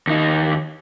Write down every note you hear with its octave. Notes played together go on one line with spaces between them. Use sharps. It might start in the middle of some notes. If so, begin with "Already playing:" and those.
D#2 D#4